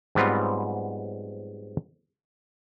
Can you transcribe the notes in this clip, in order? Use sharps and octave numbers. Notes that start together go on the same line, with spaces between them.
G#2 F#3 G3 B3 C4 F4